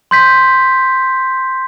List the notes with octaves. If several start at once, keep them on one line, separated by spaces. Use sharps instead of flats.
C6 G6 B6